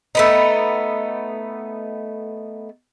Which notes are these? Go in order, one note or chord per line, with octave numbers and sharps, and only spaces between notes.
A3 B3 D#4